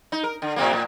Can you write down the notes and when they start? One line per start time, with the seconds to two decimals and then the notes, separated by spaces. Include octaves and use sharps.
0.12 D#4
0.23 A#4
0.42 D3
0.56 A2 C3 A#3
0.73 A2